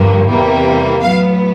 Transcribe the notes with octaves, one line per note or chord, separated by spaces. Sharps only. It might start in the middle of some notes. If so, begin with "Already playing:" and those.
Already playing: G2 D3 F3 A#3
E2 C3 E3 G3 A#3
A2 F#3 B3 F5